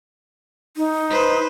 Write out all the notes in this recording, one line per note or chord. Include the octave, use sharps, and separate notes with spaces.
D#4
B4 C5